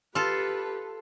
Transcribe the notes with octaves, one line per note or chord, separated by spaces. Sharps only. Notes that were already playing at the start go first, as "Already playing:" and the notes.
F4 G4 A4 B4